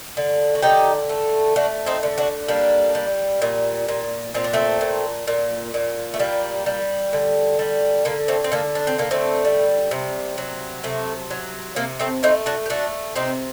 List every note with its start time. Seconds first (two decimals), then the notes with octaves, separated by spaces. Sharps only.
0.17 D3
0.55 F#4
0.62 D3 D#4 G4
1.09 A3
1.56 A3 D4 F#4
1.86 C4 D#4
2.03 D3
2.18 D4 F#4
2.48 G3 A#3 D4
2.95 G3
3.42 A#2
3.88 A#2
4.34 A#2 C4
4.44 D4
4.53 A3 C4
4.81 A#2
5.27 A#2
5.74 A#2
6.14 A3
6.19 G3 A#3
6.66 G3
7.13 D3
7.59 G3
8.05 D3 A#3
8.28 A3 C4
8.44 C4
8.52 D3 A#3 D4
8.75 D4
8.87 C4
8.98 D3 A#3
9.11 A3 C4
9.45 G3
9.91 C3
10.38 F#3
10.84 C3 A3
11.31 F#3
11.76 C3 A#3
12.00 A3 C4
12.23 A3 C4 D#4
12.46 D4 F#4
12.66 G4
12.70 A3 D4 F#4
13.16 C3 C4 D#4